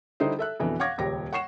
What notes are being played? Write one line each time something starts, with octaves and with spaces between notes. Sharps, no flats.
D3 G3 D#4 E4 C5
A4 E5 F#6
F2 B2 D3 E3
F5 F#5 C#6 D6 G#6 A#6
D#1 C#2 G4 C#5 A#6
F#5 C#6 C7 E7